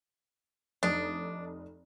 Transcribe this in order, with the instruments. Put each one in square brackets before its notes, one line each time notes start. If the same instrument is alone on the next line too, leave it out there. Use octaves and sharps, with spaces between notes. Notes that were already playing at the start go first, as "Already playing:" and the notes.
[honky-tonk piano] F1 D#4 D#6 [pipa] D4